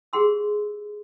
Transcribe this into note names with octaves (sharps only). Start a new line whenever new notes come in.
G4 G#4 F#5 C6 E6